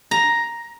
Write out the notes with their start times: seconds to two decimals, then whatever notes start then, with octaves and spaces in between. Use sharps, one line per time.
0.11 A#5